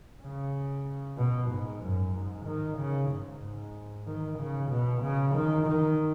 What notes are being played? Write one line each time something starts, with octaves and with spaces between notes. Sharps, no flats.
C#3
B2
G#2
F#2
G#2
D#3
C#3
G#2
G#2
D#3
C#3
B2
C#3
D#3
D#3